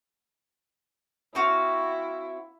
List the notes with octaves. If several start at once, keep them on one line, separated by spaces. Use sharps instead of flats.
C4 E4 F#4 F5